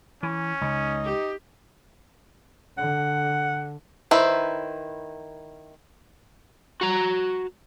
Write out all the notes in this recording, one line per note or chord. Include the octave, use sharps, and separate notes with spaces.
E3 C#4
C#2 C#3 D#4
G4
D3 F#5
D#3 E4 B4 C5
F#4 A#5